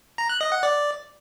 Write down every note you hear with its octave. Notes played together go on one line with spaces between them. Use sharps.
A#5
F#6
D#5
F#5
D5